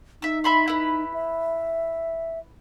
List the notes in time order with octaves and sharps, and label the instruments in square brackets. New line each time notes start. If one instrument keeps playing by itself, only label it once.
[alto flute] D#4 [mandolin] E5 E6
[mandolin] E5 B5 C6
E4 B4
[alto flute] E5